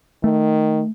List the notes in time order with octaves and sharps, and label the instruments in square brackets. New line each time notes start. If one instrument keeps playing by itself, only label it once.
[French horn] D#3 [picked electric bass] A3